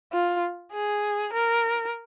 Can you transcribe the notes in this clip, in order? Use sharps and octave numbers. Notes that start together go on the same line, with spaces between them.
F4
G#4
A#4